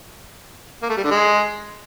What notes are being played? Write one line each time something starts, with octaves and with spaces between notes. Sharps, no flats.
A#3
A3
G3
D3
G#3